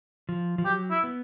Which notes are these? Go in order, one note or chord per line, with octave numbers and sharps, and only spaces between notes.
F3
F3
F#3 G4
E4
B3